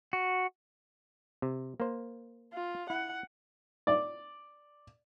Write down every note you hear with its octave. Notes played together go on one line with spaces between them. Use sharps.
F#4
C3
A#3 C5
F4
E4 F#5
D5